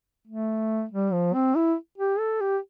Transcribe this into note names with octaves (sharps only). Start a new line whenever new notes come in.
A3
G3
F3
C4
E4
G4
A4
G4